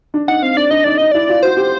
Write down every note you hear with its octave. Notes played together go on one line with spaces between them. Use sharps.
D4
D#4 F#5
C4 F5
D4 D5
D4 D#5
D#4 D5
D#4 D#5
E4 D5
F4
F#4 C5
G4